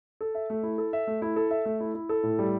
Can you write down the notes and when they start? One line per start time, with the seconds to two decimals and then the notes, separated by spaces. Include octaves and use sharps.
0.21 A4
0.35 E5
0.50 A3
0.63 E4
0.78 A4
0.93 E5
1.07 A3
1.22 E4
1.36 A4
1.51 E5
1.66 A3
1.80 E4
1.95 E4
2.09 A4
2.23 A2
2.39 G3